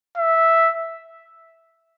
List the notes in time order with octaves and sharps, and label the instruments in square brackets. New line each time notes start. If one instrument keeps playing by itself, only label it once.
[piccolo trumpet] E5